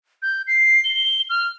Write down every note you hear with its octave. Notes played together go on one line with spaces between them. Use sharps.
G6
C7
G7
F6